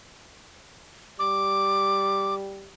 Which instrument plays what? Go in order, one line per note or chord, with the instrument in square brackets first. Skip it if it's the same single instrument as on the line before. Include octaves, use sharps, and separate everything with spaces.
[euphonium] G3 [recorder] D6